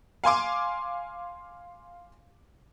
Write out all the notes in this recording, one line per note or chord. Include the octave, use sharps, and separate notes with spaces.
F5 G#5 C6 D6